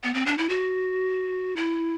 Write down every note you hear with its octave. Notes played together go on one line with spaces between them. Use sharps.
B3
C4
D4
E4
F#4
E4